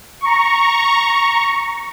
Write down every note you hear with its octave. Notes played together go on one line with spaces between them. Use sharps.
A#5 C#6